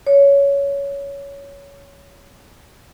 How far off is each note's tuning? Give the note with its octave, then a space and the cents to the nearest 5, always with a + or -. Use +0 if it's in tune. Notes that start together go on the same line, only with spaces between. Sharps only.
C#5 +15